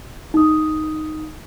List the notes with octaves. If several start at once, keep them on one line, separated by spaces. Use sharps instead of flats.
D#4 D#6